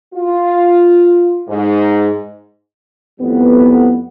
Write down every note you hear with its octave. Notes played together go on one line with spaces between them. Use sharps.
F4
G#2
F2 A2 G3 B3